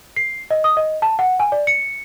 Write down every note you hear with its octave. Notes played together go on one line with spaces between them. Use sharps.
C7
D#5
D#6
D#5
A5
F#5
G#5
D5
C#7